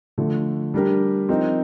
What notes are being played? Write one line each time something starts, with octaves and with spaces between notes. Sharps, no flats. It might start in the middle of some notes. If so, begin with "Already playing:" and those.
D3 F3 A3
G3 D4 G4 A#4
F3 C4 D#4 A#4